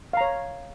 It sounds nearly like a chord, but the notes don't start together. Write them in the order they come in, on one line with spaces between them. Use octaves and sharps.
F5 A#5 C#5